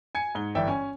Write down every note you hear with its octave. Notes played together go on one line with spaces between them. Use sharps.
G#5 G#6 C#7
G#2 G7
G1 E3 D5 E5 G5
C#4 G#5